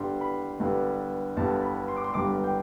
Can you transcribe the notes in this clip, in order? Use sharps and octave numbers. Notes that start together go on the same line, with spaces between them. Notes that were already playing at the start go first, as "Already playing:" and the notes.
Already playing: G1 G2 D3 G3 C6
B5
G1 G2 D3 G3
G1 G2 D3 G3 A5
A5
B5
C6
D6
C6
G1 G2 D3 G3 D6
G5